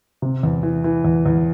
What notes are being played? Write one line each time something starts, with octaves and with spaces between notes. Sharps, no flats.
C3
E2
E3
E3
E2
E2